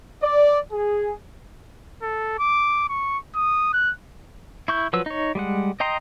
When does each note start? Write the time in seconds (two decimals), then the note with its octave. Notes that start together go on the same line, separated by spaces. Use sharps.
0.22 D5
0.72 G#4
2.02 A4
2.39 D6
2.89 C#6
3.35 D#6
3.73 F#6
4.68 E4 C#6 G6
4.93 F3 F#3 B4 E6
5.06 D#4 C#5
5.35 G3 G#3 F#5
5.80 D#5 G5 A#5 C6 D#6